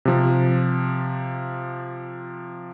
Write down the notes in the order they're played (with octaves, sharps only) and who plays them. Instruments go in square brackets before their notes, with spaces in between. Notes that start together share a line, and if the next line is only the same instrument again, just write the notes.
[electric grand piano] C3 F3